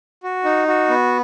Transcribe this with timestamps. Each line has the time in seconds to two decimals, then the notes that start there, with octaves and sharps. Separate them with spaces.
0.23 F#4
0.44 D#4
0.68 F#4
0.89 B3